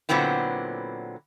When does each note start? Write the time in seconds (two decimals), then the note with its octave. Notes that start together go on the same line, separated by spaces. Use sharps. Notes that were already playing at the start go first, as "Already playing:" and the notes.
0.09 A#2 D3 F#3 B3 C4 E4